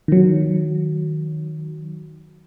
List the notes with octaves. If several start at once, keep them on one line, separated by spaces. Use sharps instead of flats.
D#3 F#3